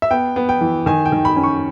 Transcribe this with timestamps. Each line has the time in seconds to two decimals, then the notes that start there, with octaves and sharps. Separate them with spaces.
0.02 E5
0.11 B3 G5
0.36 B3
0.49 G5
0.61 E3
0.86 D#3 G#5
1.06 G5
1.12 D#3
1.25 B5
1.36 C#4
1.43 C#6